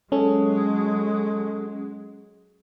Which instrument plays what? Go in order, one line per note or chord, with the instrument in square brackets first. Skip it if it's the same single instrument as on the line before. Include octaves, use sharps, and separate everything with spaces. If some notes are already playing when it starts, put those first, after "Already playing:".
[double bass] F#3 G#3 [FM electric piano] C#4 A4